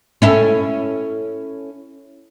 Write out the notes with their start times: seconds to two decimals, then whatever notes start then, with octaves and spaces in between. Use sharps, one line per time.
0.22 C#4 E4 A4